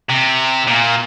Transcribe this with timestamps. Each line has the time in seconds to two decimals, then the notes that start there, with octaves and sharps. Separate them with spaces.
0.09 C3
0.67 A#2